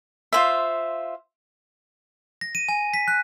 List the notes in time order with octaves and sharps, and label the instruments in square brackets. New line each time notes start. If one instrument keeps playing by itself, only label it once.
[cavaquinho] F4 C5 E5
[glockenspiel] A#6
D#7
G#5
B6
F#6